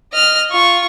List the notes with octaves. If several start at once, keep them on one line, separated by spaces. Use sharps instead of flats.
D#5 F6
F4 C#6